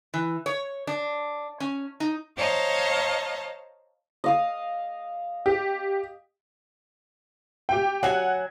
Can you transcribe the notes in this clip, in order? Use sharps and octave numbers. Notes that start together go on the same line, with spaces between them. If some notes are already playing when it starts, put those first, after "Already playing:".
E3
C#5
D4
C#4
D#4
C5 C#5 D#5 F5 A5 A#5
D#5 F5 D#6
G4
G4 G5
F#3 F#5 G#5